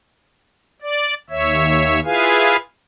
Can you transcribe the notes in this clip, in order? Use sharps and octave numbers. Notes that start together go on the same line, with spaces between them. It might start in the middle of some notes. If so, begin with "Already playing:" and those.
D5
D#2 C#5 E5
E4 F4 G#4 B4 F5 G#5